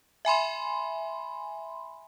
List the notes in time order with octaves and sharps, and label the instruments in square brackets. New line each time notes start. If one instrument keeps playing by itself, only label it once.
[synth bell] E5 G#5 B5 C6